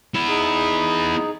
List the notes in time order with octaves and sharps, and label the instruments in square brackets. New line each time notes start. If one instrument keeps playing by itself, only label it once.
[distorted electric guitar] B3 E4
[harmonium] D#4 G#4